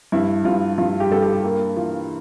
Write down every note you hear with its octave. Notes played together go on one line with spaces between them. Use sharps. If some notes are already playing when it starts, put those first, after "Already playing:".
G2 E4
G2 F4
G2 F4
G4
G2 A4
G4
A#3
E3 F4